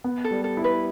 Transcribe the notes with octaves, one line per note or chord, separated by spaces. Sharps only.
B3
A4
G3
A4
E4
B4